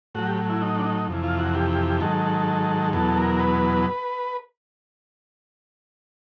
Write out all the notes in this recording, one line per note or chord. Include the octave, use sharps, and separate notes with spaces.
A2 F#3 F#4
G4
E4
D#4
D4
D#4
F2 C3 E3
F4
F#4
G4
G#2 D#3 F#3 A4
E2 B2 F#3 A4
A#4
B4